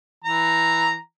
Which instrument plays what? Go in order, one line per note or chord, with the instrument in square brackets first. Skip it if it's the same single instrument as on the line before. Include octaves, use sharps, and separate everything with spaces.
[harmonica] E3 A#5